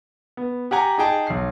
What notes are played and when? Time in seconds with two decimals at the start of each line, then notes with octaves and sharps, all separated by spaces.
0.37 B3
0.71 G4 F#5 G#5 A#5
0.98 D#4 G#4 G5 A5
1.27 B1 C7